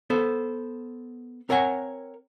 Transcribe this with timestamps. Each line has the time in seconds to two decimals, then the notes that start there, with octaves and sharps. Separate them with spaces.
0.10 B3 A4 C5
1.49 C4 A#4 C#5 F#5 G#5